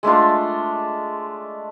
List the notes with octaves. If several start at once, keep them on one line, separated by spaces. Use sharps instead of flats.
G#3 A3 D4 F4